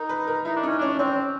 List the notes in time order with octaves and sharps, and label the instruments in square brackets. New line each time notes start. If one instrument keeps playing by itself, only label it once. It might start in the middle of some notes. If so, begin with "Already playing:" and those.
Already playing: [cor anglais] D#4 [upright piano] A#4
[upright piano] B4
A#4
[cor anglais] D#4 [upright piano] E4
[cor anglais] D4
[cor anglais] C#4 [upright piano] D#4
[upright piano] C#4 [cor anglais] D4
[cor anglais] C4 [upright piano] C#4